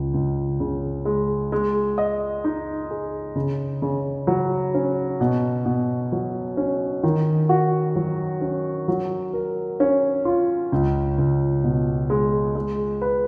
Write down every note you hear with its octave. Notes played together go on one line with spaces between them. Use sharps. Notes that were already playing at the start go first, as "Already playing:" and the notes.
Already playing: C#2
C#2
C#3
G#3
G#3
D#5
D#4
G#4
C#3
C#3
F#3
C#4
B2
B2
F#3
C#4
D#3
F#4
F#3
C#4
F#3
A#4
C#4
F4
C#2
C#2
B2
G#3
G#3
B4